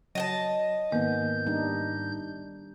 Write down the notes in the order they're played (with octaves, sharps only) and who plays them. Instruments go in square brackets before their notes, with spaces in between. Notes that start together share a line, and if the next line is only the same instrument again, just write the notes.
[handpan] F#3 [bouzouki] D#5 G5 A5
[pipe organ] G#2 G6 [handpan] D#3 B3 [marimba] A#3
[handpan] G3 D4 D#4